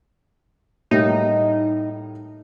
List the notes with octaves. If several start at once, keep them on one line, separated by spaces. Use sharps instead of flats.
A2 G3 A#3 D#4